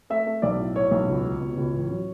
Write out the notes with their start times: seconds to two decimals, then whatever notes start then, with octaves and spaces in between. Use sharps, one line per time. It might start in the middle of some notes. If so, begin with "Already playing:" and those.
0.10 A3 E5
0.27 A3
0.42 B1 D5
0.59 A2
0.75 A2 C#5
0.91 B1
1.08 C#2
1.25 C#2
1.41 B2
1.57 C#2
1.74 A1
1.90 F#3